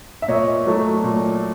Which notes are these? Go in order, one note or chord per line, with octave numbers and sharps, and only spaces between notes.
E5
A#2 C#5 D#5
F#3 A3
A#2